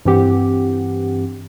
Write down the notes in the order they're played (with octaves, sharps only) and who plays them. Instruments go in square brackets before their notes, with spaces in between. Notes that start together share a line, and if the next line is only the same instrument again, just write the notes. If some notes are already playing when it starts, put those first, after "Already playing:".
[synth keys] G2 E3 C4 G4 F#5